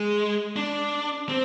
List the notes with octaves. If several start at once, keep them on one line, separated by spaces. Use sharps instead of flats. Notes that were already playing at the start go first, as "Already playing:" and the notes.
Already playing: G#3
D4
C4